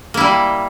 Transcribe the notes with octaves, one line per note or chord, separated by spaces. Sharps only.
G3 A#3 E4